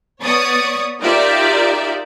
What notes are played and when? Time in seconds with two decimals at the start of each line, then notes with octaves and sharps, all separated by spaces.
0.21 B3 C#5 D5 C#6 D#6
1.01 D#4 F4 G4 A#4 D5 E5